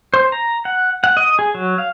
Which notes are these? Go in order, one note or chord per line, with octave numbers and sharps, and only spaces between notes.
C5
A#5
F#5
F#5
D#5
G#4
F#3
F5